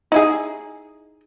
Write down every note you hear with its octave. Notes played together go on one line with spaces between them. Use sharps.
D#4 E4 G#4